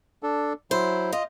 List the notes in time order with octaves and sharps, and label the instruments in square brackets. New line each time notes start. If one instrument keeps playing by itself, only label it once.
[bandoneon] D4 A4
[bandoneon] F#3 E4 [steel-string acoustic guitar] C5
[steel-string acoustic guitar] F4 [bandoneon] D#5